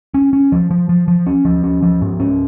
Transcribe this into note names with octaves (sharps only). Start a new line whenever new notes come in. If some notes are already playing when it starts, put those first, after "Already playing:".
C#4
C#4
F3
F3
F3
F3
C#4
F3
C#4
F3
G#2
C#4